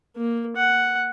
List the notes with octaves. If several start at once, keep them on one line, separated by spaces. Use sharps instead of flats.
A#3
F#5